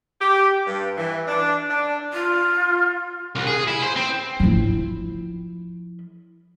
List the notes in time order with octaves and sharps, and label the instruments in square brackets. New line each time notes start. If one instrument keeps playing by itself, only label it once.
[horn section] G4
G2
E3
D4
D4
[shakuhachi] F4
[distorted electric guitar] C2
G#4
E4
C5
C4
[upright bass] F3 E4